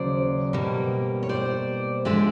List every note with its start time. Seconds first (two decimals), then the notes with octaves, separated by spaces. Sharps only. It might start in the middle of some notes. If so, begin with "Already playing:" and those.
Already playing: D#2 C#3 F#3 C5 D5
0.53 B2 G3 A#3
1.23 C#5
1.29 C5 D5
2.05 D3 F3 G#3 D5 E5